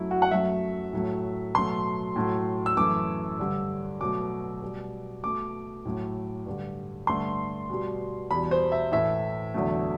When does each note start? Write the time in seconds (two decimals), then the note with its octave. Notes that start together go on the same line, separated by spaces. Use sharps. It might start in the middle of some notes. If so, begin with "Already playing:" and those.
Already playing: F#2 F#3 A3 E4
0.11 F#4
0.22 F#5
0.31 F#2 F#3 A3 E5
0.93 A2 F#3 A3
1.54 B2 F#3 A3 C6
2.16 A2 F#3 A3
2.66 E6
2.77 F#2 E3 A3 D6
3.38 G2 D3 G3
4.01 B2 F#3 A3 D6
4.62 B2 G3
5.23 B2 A3 D6
5.85 A2 F#3 A3
6.46 G2 D3 G3
7.07 G2 D3 A3 C6
7.69 B2 G3
8.31 E2 B2 G3 B5
8.51 C5
8.72 E5
8.92 A2 E3 A3 E5
9.54 E2 D3 F#3 A3